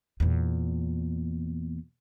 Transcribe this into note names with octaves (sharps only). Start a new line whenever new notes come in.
E2 A#2